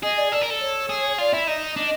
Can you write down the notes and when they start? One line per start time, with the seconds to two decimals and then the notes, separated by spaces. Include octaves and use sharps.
0.03 G#4 D#5
0.17 D5
0.32 A4 D5
0.41 A#4
0.50 A4
0.60 C#5
0.89 G#4
1.18 F4 D5
1.33 E4 E5
1.47 D#4 D#5
1.77 D4